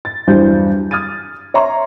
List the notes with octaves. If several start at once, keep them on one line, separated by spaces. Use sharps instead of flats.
A6
E2 G2 F#3 G3 C5 G6
D#6 F6 G#6 A6 D#7
C#5 E5 A#5 C6 C#6